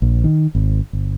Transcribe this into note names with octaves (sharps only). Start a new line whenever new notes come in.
A#1
D#3
G#1
G1